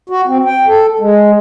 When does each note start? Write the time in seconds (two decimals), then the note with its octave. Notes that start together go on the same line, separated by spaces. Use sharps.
0.10 F#4
0.27 C4
0.45 G5
0.67 A4
1.00 G#3